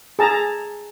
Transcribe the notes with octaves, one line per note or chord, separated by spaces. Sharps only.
G#4 A5 A#5